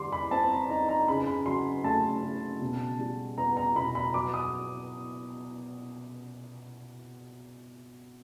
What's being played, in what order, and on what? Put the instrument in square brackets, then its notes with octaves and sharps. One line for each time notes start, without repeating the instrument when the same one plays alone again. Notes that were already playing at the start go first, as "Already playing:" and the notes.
Already playing: [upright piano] D3 G3 C6 D6
B5
C4 A5
A#5
D#4 A#5
A#5
C#3 B5
B5
F#3 C6
A3 A5
C#3
B2
G3
B3 A#5
A#5
B2 B5
B5
F#3 D6
D#6